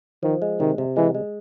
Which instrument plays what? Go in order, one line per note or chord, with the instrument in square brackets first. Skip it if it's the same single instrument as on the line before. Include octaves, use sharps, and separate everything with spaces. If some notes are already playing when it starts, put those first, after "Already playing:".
[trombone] D#3 [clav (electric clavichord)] F3
[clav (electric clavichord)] G#3
[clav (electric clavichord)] C3 [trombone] D#3
[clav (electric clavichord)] C3
[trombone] E3 [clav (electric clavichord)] G#3
[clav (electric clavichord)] G#3